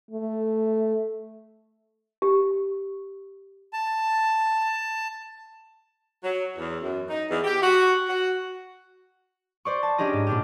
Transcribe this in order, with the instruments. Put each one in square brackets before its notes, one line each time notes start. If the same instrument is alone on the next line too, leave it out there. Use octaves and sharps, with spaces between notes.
[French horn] A3
[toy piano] G4
[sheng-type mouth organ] A5
[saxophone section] F#3
E2
F#2
D#4
E2
G4
F#4
F#4
[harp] C5 D5 C#6
A5
C#4 D4 G4 G#4 D#5
G#2
A#2 D4 G4